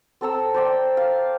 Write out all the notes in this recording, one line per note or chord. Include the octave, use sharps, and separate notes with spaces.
C4 A4 A#5 E6
C5 D5 G5
F5